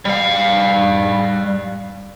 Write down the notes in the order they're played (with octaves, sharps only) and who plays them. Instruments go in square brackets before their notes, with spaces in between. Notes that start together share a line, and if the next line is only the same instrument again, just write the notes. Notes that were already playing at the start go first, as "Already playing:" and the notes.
[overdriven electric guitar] G3 F5